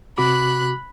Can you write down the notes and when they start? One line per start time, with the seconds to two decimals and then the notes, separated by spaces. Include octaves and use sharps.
0.18 C3 F#4 B5 D6 F#6